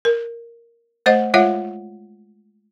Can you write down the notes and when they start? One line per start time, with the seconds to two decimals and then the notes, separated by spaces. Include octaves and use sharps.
0.05 A#4
1.06 A3 C5 D#5 F#5
1.34 G#3 F4 C#5 E5 F#5